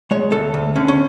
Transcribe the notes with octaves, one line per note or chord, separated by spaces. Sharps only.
G#3 C#5
D2 A4
D2
D3 C#4
C#4